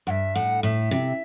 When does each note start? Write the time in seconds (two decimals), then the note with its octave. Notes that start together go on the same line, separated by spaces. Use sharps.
0.07 G2 E5 F#5
0.35 A2 F#5
0.63 A2 E5
0.91 C3